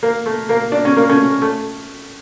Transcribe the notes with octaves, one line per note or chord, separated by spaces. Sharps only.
A#3
A3
A#3
D4
C#4
A#3
A3 C#4
A3